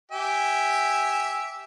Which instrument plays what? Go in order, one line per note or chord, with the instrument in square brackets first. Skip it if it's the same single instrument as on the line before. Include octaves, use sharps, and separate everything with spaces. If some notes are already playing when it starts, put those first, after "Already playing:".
[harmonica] G4 E5 G#5